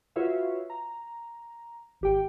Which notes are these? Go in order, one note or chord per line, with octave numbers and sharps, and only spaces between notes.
F4 F#4 B4 C#5 E5 F5
A#5
G#1 G4 G5